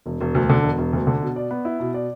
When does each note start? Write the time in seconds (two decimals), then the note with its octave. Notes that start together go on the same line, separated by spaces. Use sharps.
0.06 E1
0.21 E1
0.35 D2
0.49 D3
0.63 E1
0.78 E1
0.93 D2
1.07 D3
1.22 B2
1.36 D5
1.51 B3
1.65 E4
1.80 B2
1.94 D5